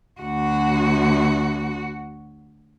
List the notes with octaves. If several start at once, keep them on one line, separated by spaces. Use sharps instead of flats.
D2 F#4